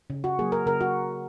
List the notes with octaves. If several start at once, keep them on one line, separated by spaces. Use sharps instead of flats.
C#3
F#4
F#3 A#3 G#4
A#4
C#3 A#4
F#4